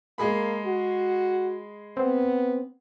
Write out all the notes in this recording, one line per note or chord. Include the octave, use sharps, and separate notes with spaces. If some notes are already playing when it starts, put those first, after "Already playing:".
G#3 A#3 G#4 B5
F#4
B3 C4